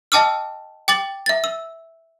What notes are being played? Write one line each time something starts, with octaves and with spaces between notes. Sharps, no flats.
D#5 G5 A5 D6 E6 F6
G5 D6 A6 F#7
E5 A6
E6